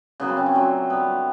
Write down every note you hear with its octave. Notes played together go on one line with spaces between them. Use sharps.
C#3 F#3 A#3 B3
C4
C#3 C#4
C4
A#2 F#3 A3
D3 G3 B3